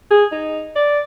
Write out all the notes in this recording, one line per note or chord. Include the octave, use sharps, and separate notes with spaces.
G#4
D#4
D5